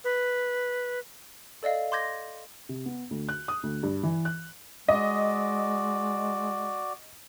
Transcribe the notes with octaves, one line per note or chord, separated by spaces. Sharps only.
B4
A4 D5 D#5 F5
C6 D6 G6 G#6 A#6
C3
B3
D2
F#6
D#6
D2
G2
E3
F#6
G#3 F#4 D5 D#5